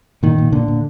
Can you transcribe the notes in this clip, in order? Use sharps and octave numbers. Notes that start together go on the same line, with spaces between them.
A#2 D#3
A#2
A#2 D3
A#2